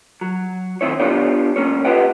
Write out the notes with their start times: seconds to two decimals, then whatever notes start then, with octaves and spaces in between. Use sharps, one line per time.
0.21 F#3
0.81 D#3 C4 E4 C#5
1.00 B3 D4 F4 G4 C#5
1.56 C#2 G2 A#3 C#4 C#5
1.85 F4 G4 B4 D#5 F#5 G5